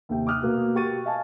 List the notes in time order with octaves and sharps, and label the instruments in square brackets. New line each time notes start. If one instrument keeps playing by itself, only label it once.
[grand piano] D#2 C3 G5
D6 D#6 F6 F#6
B2 A#3
F#4 G4 C#6 A6 D#7
D#5 F5 G#5 A5